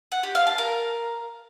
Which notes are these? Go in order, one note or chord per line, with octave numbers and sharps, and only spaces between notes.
F#5
G4
F5
A5
A#4